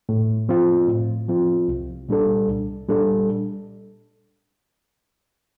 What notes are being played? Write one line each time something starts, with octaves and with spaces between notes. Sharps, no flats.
A2
F3 C4 F4
A2
F3 C4 F4
C2
A#2 G3 D4 A4
C2
A#2 G3 D4 A4